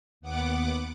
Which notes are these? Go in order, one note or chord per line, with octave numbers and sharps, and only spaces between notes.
D#2 B3 F#5 D6